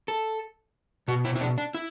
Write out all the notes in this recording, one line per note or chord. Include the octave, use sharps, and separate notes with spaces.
A4
B2 F#4
E4
E4
D4
D4
E4